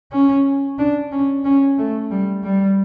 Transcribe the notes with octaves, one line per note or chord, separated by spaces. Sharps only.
C#4
D4
C#4
C#4
A3
G3
G3